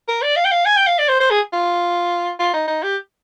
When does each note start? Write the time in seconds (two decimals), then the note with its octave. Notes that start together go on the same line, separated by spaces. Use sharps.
0.08 A#4
0.22 D5
0.36 F5
0.45 G5
0.51 F5
0.65 G#5
0.77 G5
0.87 F5
0.99 D5
1.09 C5
1.20 C5
1.31 G#4
1.53 F4
2.40 F4
2.54 D#4
2.68 D#4
2.83 G4